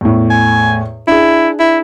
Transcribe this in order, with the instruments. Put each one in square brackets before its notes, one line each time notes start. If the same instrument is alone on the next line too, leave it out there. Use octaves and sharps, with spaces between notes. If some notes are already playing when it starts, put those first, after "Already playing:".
[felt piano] E2 A2
[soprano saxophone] G#5
[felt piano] D4 G#4 [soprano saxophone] E4
[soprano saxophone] E4